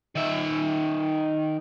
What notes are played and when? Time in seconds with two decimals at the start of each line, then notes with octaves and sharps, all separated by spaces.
0.15 D#3 E5